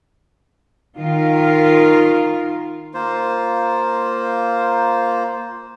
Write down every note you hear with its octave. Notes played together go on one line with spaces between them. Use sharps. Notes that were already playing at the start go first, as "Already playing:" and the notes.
D#3 F4 A#4
A#3 F4 C5